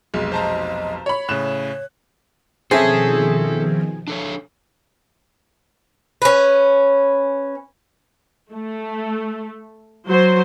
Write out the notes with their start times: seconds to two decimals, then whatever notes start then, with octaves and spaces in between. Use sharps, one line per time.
0.14 F1 B1 G#3
0.32 C5 D#5 A5 A#5
1.06 C#5 B5
1.29 A2 C#3 C#5 F#6 E7
2.71 B2 D#3 F3 C4 C#4 G#4 A4 E5
4.08 D4 A4 C#5
6.22 C#4 B4
8.52 A3
10.06 F#3 C5